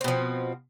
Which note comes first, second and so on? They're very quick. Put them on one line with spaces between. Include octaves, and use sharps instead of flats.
C4 B2 F3